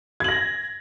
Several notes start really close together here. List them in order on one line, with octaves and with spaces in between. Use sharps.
G#6 F#7 A#6